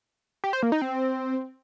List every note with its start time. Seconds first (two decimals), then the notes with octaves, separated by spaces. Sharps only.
0.44 G4
0.53 C5
0.63 A#3
0.72 D#4
0.82 C4